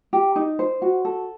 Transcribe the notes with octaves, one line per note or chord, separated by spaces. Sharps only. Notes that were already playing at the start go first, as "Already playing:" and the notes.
G4
D#4
C5
F#4
A4